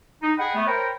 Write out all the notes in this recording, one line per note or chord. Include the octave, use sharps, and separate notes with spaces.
D#4
G#4 D#5 F#5 G5 B5
A3 B3
A#4 C5 C#5 G5 A#5 B5